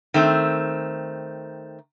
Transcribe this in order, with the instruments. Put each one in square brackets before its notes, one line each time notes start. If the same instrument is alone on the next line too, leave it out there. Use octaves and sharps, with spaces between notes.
[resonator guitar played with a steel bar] D#3 A3 C4